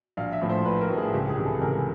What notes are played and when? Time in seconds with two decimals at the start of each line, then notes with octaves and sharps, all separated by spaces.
0.17 A#1 F5
0.33 E5
0.41 A2 F3
0.50 C5
0.65 A#1 B4
0.81 A#4
0.89 A2 F3
0.98 G#4
1.13 C#2 G4
1.29 G#4
1.37 C3 E3
1.46 A4
1.61 C#2 A#4